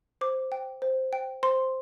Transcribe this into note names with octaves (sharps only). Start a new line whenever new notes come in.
C5 D6
G5
C5
G5
C5 C6